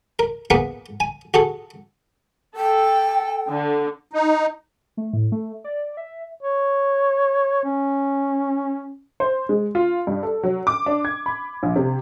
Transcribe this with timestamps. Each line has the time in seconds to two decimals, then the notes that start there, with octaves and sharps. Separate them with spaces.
0.19 A#4
0.50 A#3 B3 G#4 A#4 B4
1.00 G#5
1.34 F#4 G#4 A4
2.56 A4 G5
3.49 D3
4.13 D#4
4.97 A3
5.13 A2
5.32 A3
5.64 D5
5.97 E5
6.42 C#5
7.64 C#4
9.20 C5
9.49 G#3
9.75 F4
10.07 G2
10.23 A4
10.43 F#3
10.67 D6
10.86 D4
11.05 G#6
11.26 B5
11.63 A#1
11.76 C3